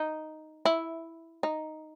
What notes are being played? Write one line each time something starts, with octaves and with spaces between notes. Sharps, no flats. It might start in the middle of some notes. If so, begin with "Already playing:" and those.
Already playing: D#4
E4
D#4